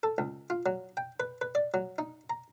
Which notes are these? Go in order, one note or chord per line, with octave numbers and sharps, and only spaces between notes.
A4
C#2
F4
F#3
G5
B4
B4
D5
F#3
D#4
A#5